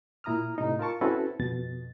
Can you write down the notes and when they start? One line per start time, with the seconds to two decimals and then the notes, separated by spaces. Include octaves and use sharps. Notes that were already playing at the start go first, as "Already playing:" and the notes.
0.24 A#2 E4 A#5 D#6 F6
0.58 A2 C3 D#4
0.79 F4 A#4 A5 C#6
1.01 C4 C#4 E4 F#4 A4 B4
1.40 F2 B2 A6